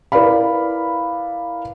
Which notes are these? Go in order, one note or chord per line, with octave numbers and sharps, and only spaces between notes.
E4 A#4 B4 D5 F5 B5